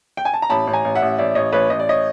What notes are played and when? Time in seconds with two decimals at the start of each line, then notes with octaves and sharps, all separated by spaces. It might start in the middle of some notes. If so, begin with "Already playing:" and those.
0.17 G5
0.25 G#5
0.34 A5
0.42 A#5
0.50 A1 A5 B5
0.67 A1
0.73 G#5 A#5
0.85 A1
0.95 E5 F#5
1.02 A1
1.18 A1 D5 E5
1.35 A1 C#5 D#5
1.53 A1 B4 C#5
1.70 A1 D#5
1.79 D5
1.89 C#5 D#5